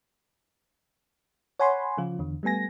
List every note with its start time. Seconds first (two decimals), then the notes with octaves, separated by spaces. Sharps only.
1.59 C#5 F#5 G#5 B5 C6
1.97 C#3 F3 F4
2.19 E2 D3
2.43 G3 A3 B3 G#5 A#6